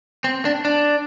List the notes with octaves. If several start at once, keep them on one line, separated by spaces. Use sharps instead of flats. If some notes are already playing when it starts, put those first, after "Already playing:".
C4
D4
D4